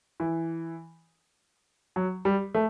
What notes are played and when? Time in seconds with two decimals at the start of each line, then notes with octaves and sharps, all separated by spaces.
0.20 E3
1.96 F#3
2.25 G3
2.54 A3